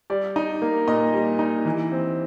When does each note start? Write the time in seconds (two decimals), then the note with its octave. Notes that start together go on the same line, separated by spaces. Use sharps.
0.10 G3 D5
0.36 D#4
0.62 A#3
0.88 A#2 D#5
1.14 G3
1.39 D#4
1.65 E3
1.92 C4